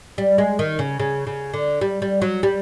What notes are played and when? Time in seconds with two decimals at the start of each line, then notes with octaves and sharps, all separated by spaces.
0.18 G3
0.38 G#3
0.59 D#3
0.79 C#3
1.00 C#3
1.27 C#3
1.53 D3
1.81 G3
2.02 G3
2.22 F#3
2.43 G3